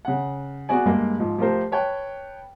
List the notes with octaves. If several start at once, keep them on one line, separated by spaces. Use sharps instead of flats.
C#3 F#5
B3 F#4 G#4 D5 G#5
G2 G#3 A#3
G#2 F3
F3 A3 F4 G4 A#4 C5
B4 C#5 G5 A5